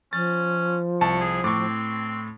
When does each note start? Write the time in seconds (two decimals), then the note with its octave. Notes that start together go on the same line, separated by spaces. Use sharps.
0.13 F3 C#4 A6
1.01 C2 A5 C#6
1.20 G#4
1.44 A2 C4 C#6 D6